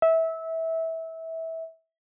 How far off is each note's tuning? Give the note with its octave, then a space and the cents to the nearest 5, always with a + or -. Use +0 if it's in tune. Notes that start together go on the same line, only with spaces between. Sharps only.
E5 -20